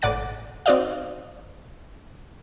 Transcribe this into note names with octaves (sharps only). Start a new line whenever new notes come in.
G#1 A2 D5 F#5 A6 D#7
C4 D#4 F#4 D5 D#5 F5